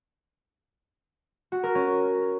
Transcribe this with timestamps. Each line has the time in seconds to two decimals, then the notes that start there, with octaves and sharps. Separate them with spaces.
1.52 F#4
1.63 A#4
1.75 C#4